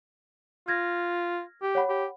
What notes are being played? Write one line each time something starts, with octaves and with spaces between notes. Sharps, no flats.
F4 F6 G#6 A#6
G4
C#5 F#5 B5
G4